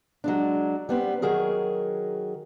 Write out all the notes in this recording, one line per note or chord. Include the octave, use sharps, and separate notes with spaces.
F#3 G#3 D4
G3 B3 C4
D#3 F#3 G#4 A#4